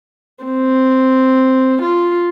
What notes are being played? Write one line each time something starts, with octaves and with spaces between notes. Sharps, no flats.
C4
F4